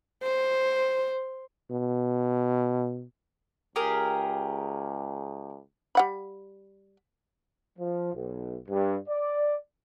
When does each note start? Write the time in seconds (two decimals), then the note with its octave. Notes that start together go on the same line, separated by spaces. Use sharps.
0.23 C5
1.71 B2
3.76 C#2 G4 G#4 A#4
5.95 G3 F#5 B5
7.77 F3
8.14 B1
8.69 G2
9.09 D5